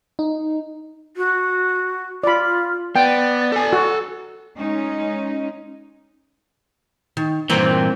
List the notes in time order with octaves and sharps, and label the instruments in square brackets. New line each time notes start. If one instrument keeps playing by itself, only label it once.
[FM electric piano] D#4
[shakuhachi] F#4
[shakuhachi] F4 [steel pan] D5 B5
[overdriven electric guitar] B3 [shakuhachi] D5 [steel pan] G5
[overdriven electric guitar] A4 G#5
[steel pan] F#4
[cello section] G#3 C#4 D#4
[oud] D#3
[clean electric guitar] G2 A#2 E3 [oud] C4 A#4 C5